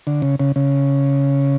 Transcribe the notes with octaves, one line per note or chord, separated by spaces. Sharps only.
D3
C#3
C#3
C#3